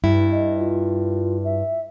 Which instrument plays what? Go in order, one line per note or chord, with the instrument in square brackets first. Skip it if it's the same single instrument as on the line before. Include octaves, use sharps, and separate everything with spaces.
[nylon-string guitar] G2 E4
[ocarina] D#5
F4
E5